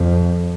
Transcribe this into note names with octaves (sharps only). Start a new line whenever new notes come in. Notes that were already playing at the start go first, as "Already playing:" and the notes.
Already playing: F2